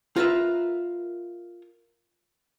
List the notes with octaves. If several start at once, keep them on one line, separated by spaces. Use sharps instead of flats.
F4 A#4 B4 E5